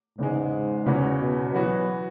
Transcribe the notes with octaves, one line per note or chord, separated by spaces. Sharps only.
E2 G#2 C#3 G#3
E2 C#3 E3 C#4 F#4
B2
E3 F#3 B3 F#4